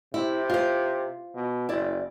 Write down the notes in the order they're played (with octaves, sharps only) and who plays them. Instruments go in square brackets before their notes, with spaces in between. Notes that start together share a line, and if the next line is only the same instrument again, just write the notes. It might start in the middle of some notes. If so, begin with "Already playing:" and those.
[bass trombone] C3 [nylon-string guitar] E4
[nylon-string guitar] F4 C5
[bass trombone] B2
[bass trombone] F#1 [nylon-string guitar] E4 D5